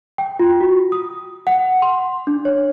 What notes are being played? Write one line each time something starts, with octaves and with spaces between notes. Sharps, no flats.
G5
F4
F#4
D#6
F#5
C6
D4
C#5